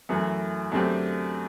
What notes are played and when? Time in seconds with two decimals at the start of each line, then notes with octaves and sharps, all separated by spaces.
0.09 F#2 E3 A3
0.72 F#2 D3 A3 C4 G4